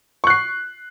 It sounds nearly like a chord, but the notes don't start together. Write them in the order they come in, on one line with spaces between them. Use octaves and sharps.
C#6 F#6 C7